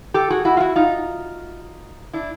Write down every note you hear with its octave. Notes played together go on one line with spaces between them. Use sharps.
G4 A4
F#4 G#4
E4 F#4
F4
E4 F#4
D#4 F4
D4 E4